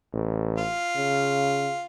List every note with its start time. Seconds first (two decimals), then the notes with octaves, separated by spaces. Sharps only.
0.13 A1
0.58 F4
0.96 C#3